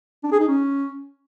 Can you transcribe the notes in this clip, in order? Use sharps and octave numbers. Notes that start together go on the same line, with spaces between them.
D4
G#4
D#4
C#4